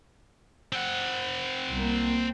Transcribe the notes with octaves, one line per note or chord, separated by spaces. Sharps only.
C4 F#5
C2 A#3